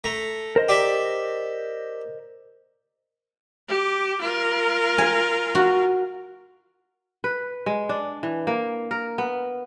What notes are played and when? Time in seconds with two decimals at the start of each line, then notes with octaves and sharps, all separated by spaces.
0.04 A3 A#5
0.56 A#4 C5 D#5
0.69 G4 D5 E5
3.69 G4 D6
4.21 F4 A#4
4.98 G#5
5.55 F#4
7.24 B4
7.66 G#3
7.89 D4
8.23 E3
8.47 A#3
8.91 A#4
9.18 B3